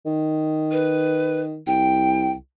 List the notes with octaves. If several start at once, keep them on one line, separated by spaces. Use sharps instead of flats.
D#3
B4
C2 G5